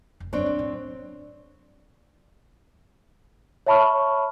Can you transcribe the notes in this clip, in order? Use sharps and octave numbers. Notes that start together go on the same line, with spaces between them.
F1
F#2 C4 D4 C#5
F#2
A2
C#5 E5 A5 B5 C#6 F6